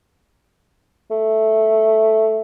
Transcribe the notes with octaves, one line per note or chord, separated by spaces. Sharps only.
A3